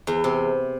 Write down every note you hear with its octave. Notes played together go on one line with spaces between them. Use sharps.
E2
C3